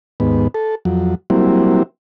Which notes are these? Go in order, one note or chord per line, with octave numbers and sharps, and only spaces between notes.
D#2 G#2 B3
A4
F2 F#3
F#3 G3 A#3 C4 E4